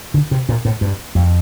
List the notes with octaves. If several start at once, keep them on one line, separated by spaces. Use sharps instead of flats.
D3
C3
A#2
A2
G2
F2